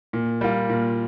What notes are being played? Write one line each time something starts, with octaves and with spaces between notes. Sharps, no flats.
A#2
G3 A#3 F4
A#2